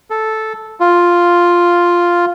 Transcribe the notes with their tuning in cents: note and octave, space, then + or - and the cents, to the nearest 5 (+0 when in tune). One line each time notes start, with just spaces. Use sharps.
A4 -5
F4 +0